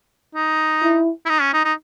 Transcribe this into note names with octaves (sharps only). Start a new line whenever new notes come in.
D#4
E4
E4
D#4
C#4
D#4
D#4